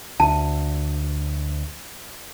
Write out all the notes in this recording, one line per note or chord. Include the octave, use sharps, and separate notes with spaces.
D2 A5